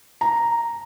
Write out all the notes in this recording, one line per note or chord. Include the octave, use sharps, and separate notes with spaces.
A#5